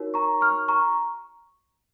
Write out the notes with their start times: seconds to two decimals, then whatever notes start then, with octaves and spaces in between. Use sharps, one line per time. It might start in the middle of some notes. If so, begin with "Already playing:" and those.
Already playing: D#4 F#4 A#4 C#5
0.14 A#5 C#6
0.41 C#6 F6
0.68 A#5 C#6